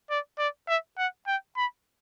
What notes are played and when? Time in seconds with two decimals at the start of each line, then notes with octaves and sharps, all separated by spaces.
0.10 D5
0.39 D5
0.68 E5
0.98 F#5
1.27 G5
1.57 B5